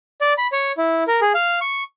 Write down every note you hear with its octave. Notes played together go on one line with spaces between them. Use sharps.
D5
B5
C#5
E4
A#4
G#4
F5
C#6